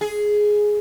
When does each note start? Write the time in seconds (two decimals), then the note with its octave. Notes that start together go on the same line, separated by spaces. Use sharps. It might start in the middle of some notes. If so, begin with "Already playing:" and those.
0.01 G#4